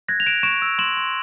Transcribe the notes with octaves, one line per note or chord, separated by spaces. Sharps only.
F#6 G#6 A#6
F7
F#6 D7 E7
C#6 D7 E7
E6
C6 E7 F#7
C6